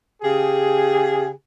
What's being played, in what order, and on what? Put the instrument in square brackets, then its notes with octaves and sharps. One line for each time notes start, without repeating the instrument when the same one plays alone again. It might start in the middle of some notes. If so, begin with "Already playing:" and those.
[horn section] C#3 G4 G#4